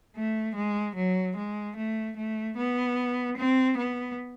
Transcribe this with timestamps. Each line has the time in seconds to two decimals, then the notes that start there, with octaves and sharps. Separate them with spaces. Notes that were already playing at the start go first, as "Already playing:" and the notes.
0.16 A3
0.56 G#3
0.96 F#3
1.37 G#3
1.77 A3
2.17 A3
2.57 B3
3.37 C4
3.78 B3